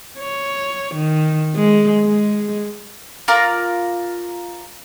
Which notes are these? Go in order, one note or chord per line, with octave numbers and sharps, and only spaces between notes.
C#5
D#3
G#3
G#3
F4 A#4 D5 A#5